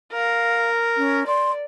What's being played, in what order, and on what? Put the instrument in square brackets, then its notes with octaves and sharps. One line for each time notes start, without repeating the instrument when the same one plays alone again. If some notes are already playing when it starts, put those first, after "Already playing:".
[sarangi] A#4 [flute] F5
[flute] C#4
[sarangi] D5 [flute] C6